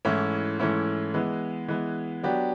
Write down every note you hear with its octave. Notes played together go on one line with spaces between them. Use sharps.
G#2 E3 A3 C#4 E4
G#2 E3 A3 C#4 E4
E3 G#3 B3
E3 G#3 B3
F#3 B3 D4 G4